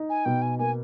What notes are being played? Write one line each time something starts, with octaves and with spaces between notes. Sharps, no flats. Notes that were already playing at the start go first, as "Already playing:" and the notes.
Already playing: D#4
G#5
B2 G5
G#5
A#3 G#5